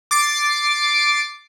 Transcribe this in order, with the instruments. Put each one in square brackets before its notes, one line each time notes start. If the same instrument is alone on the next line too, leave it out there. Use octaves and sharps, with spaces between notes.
[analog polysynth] D6 A6 C7 D7